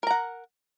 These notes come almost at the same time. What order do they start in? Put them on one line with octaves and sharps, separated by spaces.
A#4 A#5 F#5